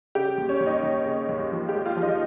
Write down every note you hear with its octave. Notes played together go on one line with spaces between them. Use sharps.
C#3 G4
D#2
C#4
D#2
D#4
D#2
C#3
D#2
F3
G4
G#3
F4
F3
D#4